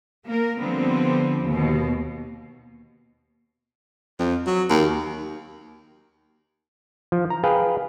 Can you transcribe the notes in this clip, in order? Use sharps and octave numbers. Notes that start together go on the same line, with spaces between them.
A#3 A#4
D3 F3 G3 B3 C4
D#2 B2
F2
F#3
D#2
F3
A#5
G#4 B4 F5 G5